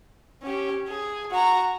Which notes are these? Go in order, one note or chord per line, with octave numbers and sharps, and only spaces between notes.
C#4 G4
G#4
F#4 A#5